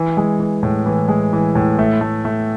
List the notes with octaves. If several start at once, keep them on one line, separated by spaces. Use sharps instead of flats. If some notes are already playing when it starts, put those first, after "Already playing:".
Already playing: E3
G#3
E3
A2
E3
G#3
E3
A2
A3
A3
A3